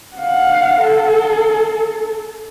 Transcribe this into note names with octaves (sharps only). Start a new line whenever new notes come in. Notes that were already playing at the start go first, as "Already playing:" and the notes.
F5 F#5
A4